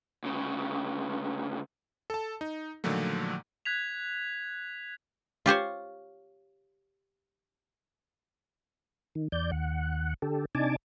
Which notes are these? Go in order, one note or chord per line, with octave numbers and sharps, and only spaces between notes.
D2 C#3
A4 A5
D#4
A#2 D3 D#3 F3 F#3 A3
F#6 G#6 B6 F7
F4 G4 C5 C#5
D#3
E2 D5 G6
D#2 F#5
D3 G4 A4
C3 D4 D#4 G#5 A5 D6